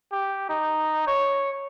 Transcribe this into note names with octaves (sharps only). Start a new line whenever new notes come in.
G4
D#4
C#5